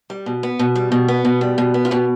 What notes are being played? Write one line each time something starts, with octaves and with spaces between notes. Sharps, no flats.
G3
B2
B3
B2
G3
B2
B3
B2
G3
B2
B3
F4
B2 G4